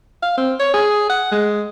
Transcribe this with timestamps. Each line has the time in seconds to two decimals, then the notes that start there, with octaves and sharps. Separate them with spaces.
0.22 F5
0.37 C4
0.60 C#5
0.74 G#4
1.09 F#5
1.31 G#3